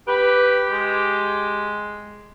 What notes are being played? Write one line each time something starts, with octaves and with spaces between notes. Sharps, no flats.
G4 B4
G#3